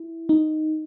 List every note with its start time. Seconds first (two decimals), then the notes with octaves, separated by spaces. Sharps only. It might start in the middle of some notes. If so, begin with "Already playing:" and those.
Already playing: E4
0.29 D#4